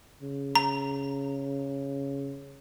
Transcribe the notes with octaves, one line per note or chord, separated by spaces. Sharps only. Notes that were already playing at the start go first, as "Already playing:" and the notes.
C#3
A#5